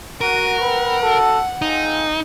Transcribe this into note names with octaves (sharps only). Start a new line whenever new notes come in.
F#4 A#4 D#7
C4 B4 F#5
F#4 A4
C4 D#4 F4 G#4